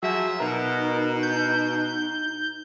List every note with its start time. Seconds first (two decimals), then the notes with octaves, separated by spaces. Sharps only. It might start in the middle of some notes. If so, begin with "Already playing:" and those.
0.03 F3 F#3 G#4 E5
0.40 B2 D#4 A#4
1.23 G6